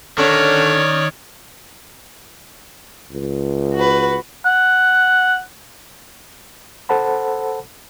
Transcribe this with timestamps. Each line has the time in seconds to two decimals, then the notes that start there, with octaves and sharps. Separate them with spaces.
0.18 D3 D#3 C#4 C#5 D5
3.12 C#2
3.76 F#4 B4
4.45 F#5
6.89 A4 C5 F#5 A5 B5